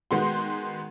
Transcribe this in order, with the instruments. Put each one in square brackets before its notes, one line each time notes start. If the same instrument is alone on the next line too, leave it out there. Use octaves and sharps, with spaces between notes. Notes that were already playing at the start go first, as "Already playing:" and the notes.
[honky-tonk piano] D#3 G#3 B3 F#4 C6